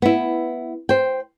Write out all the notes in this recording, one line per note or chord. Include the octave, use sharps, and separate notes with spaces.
B3 E4
C5 G5